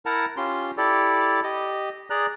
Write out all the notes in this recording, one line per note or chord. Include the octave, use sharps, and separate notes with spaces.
E4 A#4 F#5 A5 A#5
C#4 F4 G4 C6
E4 G4 A4 D5
G4 D#5
G#4 D5 A#5 F#6